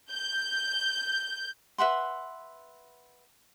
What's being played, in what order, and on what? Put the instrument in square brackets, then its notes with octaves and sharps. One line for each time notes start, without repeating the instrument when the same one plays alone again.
[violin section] G6
[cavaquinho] B4 E5 F#5 C6